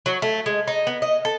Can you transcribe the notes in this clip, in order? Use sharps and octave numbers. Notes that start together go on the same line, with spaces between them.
F#3
A3
G#3
D#4
B3
D#5
A4